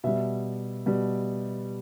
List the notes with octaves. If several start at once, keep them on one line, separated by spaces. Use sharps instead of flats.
B2 G3 E5
B2 G3